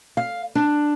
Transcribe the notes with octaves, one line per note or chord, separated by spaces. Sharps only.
F5
D4